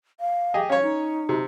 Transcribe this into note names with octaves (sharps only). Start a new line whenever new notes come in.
F5
G4 G#4 D#5
C#4 C#5 F5
D#4
C3